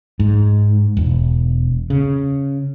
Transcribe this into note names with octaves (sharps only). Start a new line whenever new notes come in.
G#2
E1
C#3